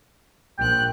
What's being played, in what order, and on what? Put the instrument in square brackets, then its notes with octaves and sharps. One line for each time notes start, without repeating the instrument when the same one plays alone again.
[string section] A#1 F#6 [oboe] G5